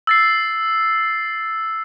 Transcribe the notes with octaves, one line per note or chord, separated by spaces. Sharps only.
E6 A6 C7